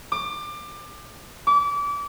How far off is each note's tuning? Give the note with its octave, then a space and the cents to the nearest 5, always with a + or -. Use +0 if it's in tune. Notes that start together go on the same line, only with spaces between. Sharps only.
D6 +25
D6 -30